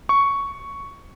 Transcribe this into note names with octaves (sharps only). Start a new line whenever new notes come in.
C#6